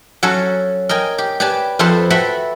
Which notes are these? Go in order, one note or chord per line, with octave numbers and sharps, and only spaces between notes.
F#3 C#4 F#4 A4
A#4 D#5 G5 G#5
G4
G4 B4 D5 G#5 A5
F2 F4 A4 B4 C5 A5
F#4 A4 B4 E5 G5